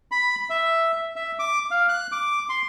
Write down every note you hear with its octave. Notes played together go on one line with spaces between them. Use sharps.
B5
E5
E5
D6
F5
F#6
D6
C6